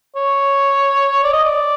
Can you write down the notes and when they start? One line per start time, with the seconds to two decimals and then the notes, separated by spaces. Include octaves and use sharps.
0.16 C#5
1.24 D5
1.33 D#5
1.44 D5